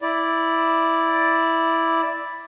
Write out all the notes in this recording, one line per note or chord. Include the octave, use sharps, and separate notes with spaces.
E4 D5